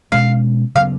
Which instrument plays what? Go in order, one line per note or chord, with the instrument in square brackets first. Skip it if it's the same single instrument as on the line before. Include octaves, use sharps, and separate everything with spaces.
[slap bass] B2 G#3 C#4 [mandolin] F5
[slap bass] C#3 F#3 B3 [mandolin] F5